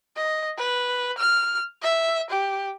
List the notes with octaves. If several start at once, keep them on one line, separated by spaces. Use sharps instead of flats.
D#5
B4
F6
E5
G4